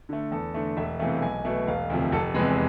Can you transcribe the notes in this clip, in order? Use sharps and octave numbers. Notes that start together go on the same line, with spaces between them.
D3 A3
E2 A4
D3 A3
E1 E5
E2 C3 E3 A3 F5
B1 G#5
B2 A3
E1 F5
D2 C3 F3
F1 A4
E2 C3 G#3 B4